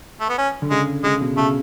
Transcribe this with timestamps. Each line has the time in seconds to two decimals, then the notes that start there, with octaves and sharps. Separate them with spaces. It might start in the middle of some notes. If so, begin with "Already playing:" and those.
0.20 A3
0.29 B3
0.38 C#4
0.62 D3
0.71 C#3 G#3
1.04 C#3 G#3
1.21 B2
1.37 C#3 A3